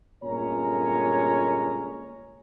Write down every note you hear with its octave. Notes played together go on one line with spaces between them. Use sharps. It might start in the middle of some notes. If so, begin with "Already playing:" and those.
G1 A#2 G#3 C#4 C#5 A#5